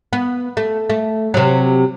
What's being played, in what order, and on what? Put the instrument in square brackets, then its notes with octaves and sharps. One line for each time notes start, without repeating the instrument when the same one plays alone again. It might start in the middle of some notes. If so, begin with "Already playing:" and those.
[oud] B3
A3
A3
C3 F#3